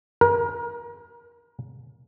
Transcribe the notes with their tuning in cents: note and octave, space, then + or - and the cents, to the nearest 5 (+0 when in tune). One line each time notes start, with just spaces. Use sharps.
A#4 +30